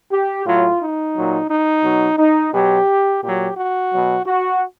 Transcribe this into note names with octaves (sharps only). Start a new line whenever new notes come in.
G4
A2 F#3 F4
D#4
A#2 F#3
D#4
B2 F#3
D#4
B2 F#3 G4
A#2 F#3 G4
F#4
B2 F#3
F#4